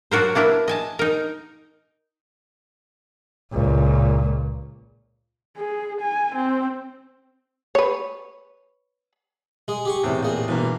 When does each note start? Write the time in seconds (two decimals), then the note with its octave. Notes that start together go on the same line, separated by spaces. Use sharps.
0.11 F#3 D4 F#4 A#4 C5
0.35 A#3 D4 E4 A#4 B4
0.68 D#5 G#5 A5
0.99 D#4 A#4
3.52 C#2 A#2
5.57 G#4
6.01 G#5
6.35 C4
7.75 B4 C#5
9.68 G#3 G#4
9.85 G4 G#4 C#6
10.04 E2 A2 C3
10.23 A#2 G#4
10.48 G2 B2 E3 A#3